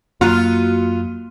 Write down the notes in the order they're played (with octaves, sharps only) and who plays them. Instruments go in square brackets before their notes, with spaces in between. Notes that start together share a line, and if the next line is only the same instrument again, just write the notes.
[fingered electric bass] F#2 [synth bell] A#3 F#4 D#7 [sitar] F4